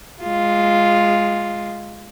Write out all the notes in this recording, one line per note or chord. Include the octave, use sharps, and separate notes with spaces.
G#3 F4